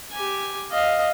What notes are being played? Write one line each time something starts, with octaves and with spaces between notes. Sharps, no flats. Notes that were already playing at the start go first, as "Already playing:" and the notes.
G4 G#5
D#5 F5